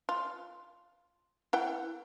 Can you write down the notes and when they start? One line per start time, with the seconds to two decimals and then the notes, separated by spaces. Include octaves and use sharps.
0.09 F4
1.53 E4 F#5 G5